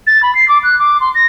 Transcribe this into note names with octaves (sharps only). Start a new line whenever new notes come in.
A6
B5
C7
D6
F#6
D6
C6
A#6